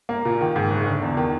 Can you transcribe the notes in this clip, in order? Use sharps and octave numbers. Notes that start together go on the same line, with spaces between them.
A#3
A#2
D#3
G#2
F#1
D3
E2
D#3